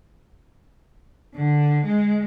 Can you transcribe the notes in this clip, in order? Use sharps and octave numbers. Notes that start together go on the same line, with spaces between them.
D3
G#3